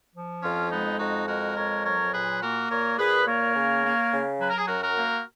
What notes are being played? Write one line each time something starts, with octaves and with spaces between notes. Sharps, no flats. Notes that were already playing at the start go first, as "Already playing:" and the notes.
F3
F2 C#4 F4
G#3 B3 D#4
F2 D#4 F#4
G#3 F#4 A#4
F2 A#4 C#5
F#3 A#4 C#5
A#2 G#4 B4
A#3 F#4 A#4
A#2 A#4 C#5
A#2 G#4 B4
A#3 A#4 C#5
C#3
A#3
C#3
F#3 B4
A#4
G#4
F#2 F#4 A#4
F#4 A#4
A#3